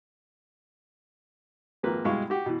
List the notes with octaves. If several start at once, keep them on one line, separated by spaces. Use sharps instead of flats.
G#1 F3 A#3 B4
G2 B2 G#3 E4 F5 C#6
F#4 G4
B2 E3